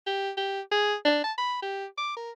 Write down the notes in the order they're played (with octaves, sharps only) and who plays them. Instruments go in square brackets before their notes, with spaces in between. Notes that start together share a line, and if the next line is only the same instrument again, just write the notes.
[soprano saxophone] G4
G4
G#4
D4
A5
B5
G4
D6
A#4